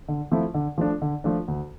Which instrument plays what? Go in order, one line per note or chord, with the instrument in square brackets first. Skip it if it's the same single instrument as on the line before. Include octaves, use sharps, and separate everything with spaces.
[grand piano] D3
F3 A3 C4 E4
D3
F3 A3 D4
D3
F3 A3 D4
D2